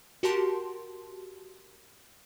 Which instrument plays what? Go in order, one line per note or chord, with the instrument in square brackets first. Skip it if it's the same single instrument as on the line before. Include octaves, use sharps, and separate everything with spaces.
[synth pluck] F#4 G4 A#4 A5 C6